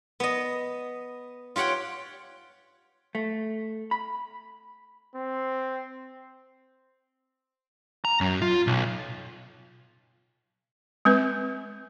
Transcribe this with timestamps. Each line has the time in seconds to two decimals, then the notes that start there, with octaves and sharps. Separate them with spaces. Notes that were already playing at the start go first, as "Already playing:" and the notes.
0.20 B3 D#5
1.56 F4 G4 C#5 F#5 G5
3.15 A3
3.91 B5
5.16 C4
8.05 A#5
8.21 F#2
8.42 F4
8.67 B1
11.05 G#3 C4 B4